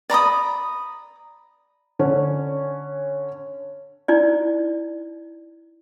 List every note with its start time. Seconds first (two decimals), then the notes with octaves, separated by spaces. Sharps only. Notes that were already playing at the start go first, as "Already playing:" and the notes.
0.10 D5 A#5 B5 D#6
1.99 D3 C#4
4.08 D#4 E4 D5